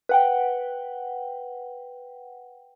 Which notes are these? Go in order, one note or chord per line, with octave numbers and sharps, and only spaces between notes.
B4 F#5 G5